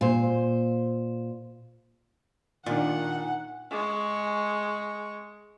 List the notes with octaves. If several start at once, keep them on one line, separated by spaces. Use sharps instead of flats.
A#2 C5
A#2 D#3 D4 F4 F#5
G#3 C#6